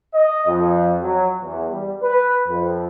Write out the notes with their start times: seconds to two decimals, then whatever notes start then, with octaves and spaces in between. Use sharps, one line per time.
0.14 D#5
0.47 F2
1.03 F#3
1.41 E2
1.70 G3
2.02 B4
2.47 F2